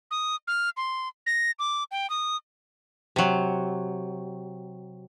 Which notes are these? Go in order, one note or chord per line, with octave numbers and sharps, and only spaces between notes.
D#6
F6
C6
A#6
D6
G5
D#6
C3 F#3